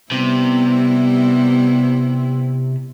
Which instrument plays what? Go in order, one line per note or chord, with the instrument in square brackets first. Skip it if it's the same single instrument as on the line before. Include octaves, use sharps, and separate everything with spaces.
[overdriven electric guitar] C3 [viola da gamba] G3 B3 E4